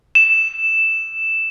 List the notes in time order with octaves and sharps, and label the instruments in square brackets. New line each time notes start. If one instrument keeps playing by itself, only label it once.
[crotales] E7